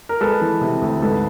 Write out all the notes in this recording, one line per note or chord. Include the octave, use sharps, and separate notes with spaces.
A#4
G#3 A4 B4
E3
C3
D2
G#2 A4 B4